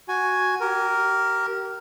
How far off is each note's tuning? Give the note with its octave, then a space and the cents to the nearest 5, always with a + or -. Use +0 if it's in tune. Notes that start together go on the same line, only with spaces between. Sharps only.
F#4 +0 G#5 +5
G4 -35 A#4 +0